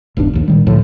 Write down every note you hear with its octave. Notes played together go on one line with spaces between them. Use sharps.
D#1 B1 G2 D4
A#1 D#2
A#2 D#3 G3
C#2 A2 D3 F3